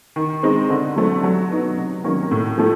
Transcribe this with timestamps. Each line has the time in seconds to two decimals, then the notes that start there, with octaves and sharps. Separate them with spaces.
0.16 D#3
0.43 G#3 C4 D#4
0.70 D3
0.96 F#3 A3 C4
1.23 F#3
1.51 B3 D#4
1.77 C3
2.04 D#3 F#3 A#3 C#4
2.31 A2
2.58 F3 A3